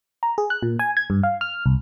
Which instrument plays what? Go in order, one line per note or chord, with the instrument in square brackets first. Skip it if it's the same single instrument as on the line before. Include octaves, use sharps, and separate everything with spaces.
[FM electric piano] A#5
G#4
F#6
A#2
G#5
G#6
G2
F5
F6
C2